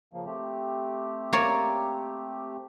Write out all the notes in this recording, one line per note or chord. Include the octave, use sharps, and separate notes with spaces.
C#3 F3 A#3
A3 C4 G4
A#3 C#5 D5